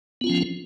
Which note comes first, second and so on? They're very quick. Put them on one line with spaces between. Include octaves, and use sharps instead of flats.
B3 F4 C#4 F3